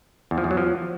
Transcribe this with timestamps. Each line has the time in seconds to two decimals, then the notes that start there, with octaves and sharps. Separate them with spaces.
0.31 E2
0.38 F3
0.44 E2
0.51 F#3
0.57 F3